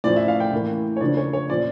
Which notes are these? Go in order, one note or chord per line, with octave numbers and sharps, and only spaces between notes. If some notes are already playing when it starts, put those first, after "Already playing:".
A2 F3 C#4 D5
E5
F5
G5
A2 E3 A#3 C#4
C#5
C#3 F3 A#3 D4 D5
C#5
C#5
A#2 F3 C#4 D5